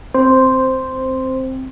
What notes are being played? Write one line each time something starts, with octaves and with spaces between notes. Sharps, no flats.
C4 C5